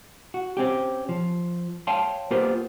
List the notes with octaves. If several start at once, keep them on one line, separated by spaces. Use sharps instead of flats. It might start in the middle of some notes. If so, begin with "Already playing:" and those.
F#4
C4 C#4 G4
F3
C#5 F5 G5 A5 C6
A#3 B3 F4 G4 A#4 C5